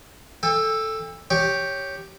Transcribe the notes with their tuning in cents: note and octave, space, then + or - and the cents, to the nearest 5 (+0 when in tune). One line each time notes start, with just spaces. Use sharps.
A4 +0 G5 +40
G4 +0 C#5 +0